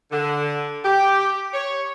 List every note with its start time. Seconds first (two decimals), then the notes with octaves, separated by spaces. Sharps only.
0.11 D3
0.84 G4
1.54 C#5